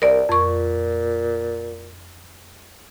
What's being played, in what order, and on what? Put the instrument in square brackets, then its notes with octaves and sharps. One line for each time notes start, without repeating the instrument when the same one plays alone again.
[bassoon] C2 [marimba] A#4 D5
[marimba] F2 C#6 [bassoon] A#2